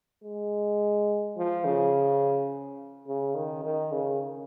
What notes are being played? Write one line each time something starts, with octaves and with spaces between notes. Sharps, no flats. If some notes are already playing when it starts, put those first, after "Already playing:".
G#3
F3
C#3
C#3
D#3
D#3
C#3